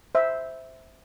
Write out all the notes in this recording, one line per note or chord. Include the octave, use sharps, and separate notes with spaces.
C5 E5